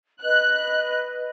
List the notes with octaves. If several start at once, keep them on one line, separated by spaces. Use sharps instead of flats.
B4 D#5 F#6